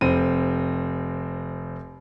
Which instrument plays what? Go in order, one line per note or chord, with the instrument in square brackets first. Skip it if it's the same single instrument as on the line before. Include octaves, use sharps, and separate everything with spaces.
[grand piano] F1 C4 D#7